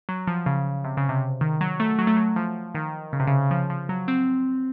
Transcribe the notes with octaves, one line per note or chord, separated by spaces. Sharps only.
F#3
F3
C#3
C3
C#3
C3
D#3
F#3
A3
F#3
A3
F#3
F3
D#3
C#3
C3
C#3
F3
F3
F#3
C4